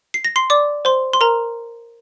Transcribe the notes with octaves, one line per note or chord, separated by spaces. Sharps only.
C7
A#6
C6 C7
D5 D6
C5 C6
C6
A#4 A#5